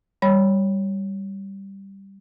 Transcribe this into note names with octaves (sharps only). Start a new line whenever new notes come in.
G3 C#5 B5